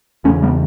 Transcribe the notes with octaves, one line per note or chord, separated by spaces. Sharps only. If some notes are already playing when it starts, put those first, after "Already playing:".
E2 A3 C#4
C#3
G3 B3